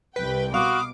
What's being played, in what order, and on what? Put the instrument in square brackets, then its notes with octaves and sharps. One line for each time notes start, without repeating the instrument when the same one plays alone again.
[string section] C2 G5 [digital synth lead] B4
[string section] B2 D6 [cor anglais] F#4 [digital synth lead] F5 [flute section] B5 C6 D#6